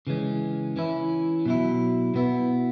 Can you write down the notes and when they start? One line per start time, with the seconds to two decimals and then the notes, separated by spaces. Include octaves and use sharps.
0.07 C#3 E3 G#3 C#4
0.76 E3 C#4 E4
1.46 B2 F#3 E4
2.14 B2 B3 E4